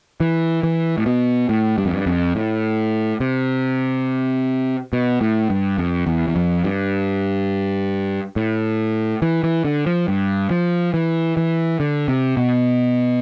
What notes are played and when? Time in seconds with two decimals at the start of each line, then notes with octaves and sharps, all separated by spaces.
0.20 E3
0.63 E3
0.98 A2
1.06 B2
1.49 A2
1.78 G2
1.85 F2
1.93 G2
2.06 F2
2.35 A2
3.20 C3
4.93 B2
5.21 A2
5.50 G2
5.78 F2
6.07 E2
6.28 E2
6.36 F2
6.64 G2
8.36 A2
9.22 E3
9.43 E3
9.64 D3
9.86 F3
10.08 G2
10.50 F3
10.94 E3
11.37 E3
11.80 D3
12.08 C3
12.37 B2